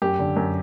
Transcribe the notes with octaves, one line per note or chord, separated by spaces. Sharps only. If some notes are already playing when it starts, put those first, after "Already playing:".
F#2 G4
D3
F#2